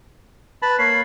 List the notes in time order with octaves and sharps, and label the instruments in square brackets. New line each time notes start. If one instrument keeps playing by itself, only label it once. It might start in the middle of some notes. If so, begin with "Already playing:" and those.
[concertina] B4 A5 B5
[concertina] A#3 C#5 B5 [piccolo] C7